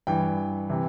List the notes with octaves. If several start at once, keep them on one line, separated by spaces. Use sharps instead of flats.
G2 E3 G5
C3 E3